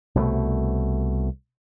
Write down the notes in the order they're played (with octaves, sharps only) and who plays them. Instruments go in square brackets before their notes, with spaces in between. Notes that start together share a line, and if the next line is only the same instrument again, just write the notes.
[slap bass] C2 B2 G3 A3